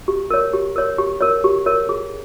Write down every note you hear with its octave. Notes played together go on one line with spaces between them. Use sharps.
G4
A#4 C#5
G4
A#4 C#5
G4
A#4 C#5
G4
A#4 C#5
G#4